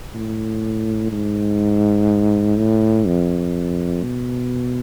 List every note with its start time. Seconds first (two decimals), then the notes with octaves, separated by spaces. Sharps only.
0.14 A2
1.12 G#2
2.57 A2
3.07 F2
4.03 B2